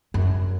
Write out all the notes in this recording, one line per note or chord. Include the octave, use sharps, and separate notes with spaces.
F#2